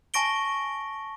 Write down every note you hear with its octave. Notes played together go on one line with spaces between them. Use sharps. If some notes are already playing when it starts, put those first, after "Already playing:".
G#5 A5 C#6 A#6 D7 G7